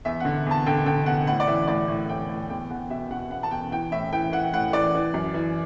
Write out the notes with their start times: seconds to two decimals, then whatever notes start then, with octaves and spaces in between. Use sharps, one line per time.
0.05 E2 E5
0.20 D3 F#5
0.46 E2 A5
0.66 D3 G5
0.86 D3 G5
1.06 E2 F#5
1.27 A2 F#5
1.40 D5
1.48 E3 E5
1.68 A2 D5
1.88 A2
2.09 A2 G5
2.29 A2
2.49 E2 G5
2.70 E2 F#5
2.90 B2 E5
3.10 B2 F#5
3.31 E2 F#5
3.43 A5
3.51 E2 G5
3.72 E3 G5
3.92 A2 E5
4.12 E3 G5
4.32 E3 F#5
4.53 A2 F#5
4.73 E3 D5
4.95 E3
5.14 F#2
5.34 E3